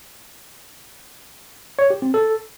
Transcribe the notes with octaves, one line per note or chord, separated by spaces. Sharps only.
C#5
G4
C4
A4